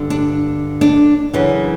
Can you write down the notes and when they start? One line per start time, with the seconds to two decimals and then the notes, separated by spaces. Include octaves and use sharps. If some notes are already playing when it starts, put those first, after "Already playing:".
Already playing: G2 D3
0.10 D4
0.81 D4
1.34 F#2 C#3 E3